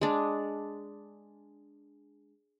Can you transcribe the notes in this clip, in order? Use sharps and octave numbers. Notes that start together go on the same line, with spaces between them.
G#3 D4